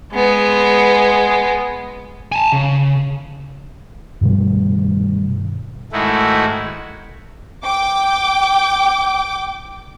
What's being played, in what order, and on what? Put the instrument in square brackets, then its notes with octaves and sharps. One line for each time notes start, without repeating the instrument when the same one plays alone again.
[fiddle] G#3 B3
[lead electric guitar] G#5 A5
C#3
[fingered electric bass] G2 B2 D#3 G3
[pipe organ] G#2 D#3 G#3 A3 E4 F#4
[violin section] G5 D6